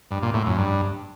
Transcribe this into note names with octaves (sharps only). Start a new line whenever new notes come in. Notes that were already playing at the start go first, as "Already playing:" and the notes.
G2
A#2
A2
F#2
G2